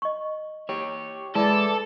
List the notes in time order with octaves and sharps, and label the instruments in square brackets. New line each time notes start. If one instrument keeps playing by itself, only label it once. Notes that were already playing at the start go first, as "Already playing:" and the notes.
[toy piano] D#5 C#6
[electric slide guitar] G4 C#5
[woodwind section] E3 E4 D5 [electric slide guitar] G#3 [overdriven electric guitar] A4